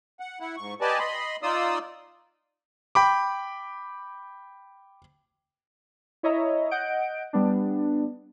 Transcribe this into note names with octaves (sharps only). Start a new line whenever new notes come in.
F#5
E4 F#5
G#2 C#6
G4 B4 D5 D#5 G#5 A5
D#5 B5 C6
D#4 F4 D5 C6 D#6 E6
G5 B5 D6
E4 C#5 D#5 E5 A#5
D#5 F#5 G6 D7
G3 B3 D4